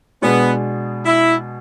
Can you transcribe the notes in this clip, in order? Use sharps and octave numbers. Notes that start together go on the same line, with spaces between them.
B2 G#3 B3 D4 G#4
E4